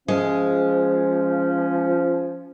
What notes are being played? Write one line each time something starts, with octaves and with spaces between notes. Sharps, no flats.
F3 G#3 C#4